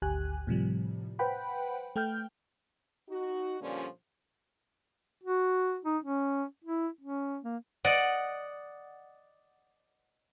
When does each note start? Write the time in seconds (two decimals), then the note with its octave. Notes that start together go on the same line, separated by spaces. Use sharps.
0.02 G#1 D2 G4 G#5 F#6
0.47 A2 C3 F3 G3
1.19 B4 C5 F#5 G5 B5
1.96 A3 G5 F6 G6
3.10 D#4 F#4
3.60 A#2 D3 F3 G3 C#4
5.24 F#4
5.85 D#4
6.04 C#4
6.65 E4
7.01 C#4
7.43 A#3
7.85 D5 D#5 F#5